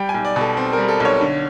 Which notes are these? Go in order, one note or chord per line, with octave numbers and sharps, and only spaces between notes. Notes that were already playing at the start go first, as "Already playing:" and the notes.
Already playing: G3 G5
G#5
B1
D5
B2
A4
C4
G3 A#4
A4
B1 C#5
D3